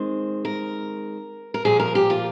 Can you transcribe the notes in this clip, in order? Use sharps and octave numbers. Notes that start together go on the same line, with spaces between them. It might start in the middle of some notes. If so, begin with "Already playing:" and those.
Already playing: D#3 G#3 C4 C5
A#4
A#4
A#2 F3 A#3 G#4
A#4
G4
F4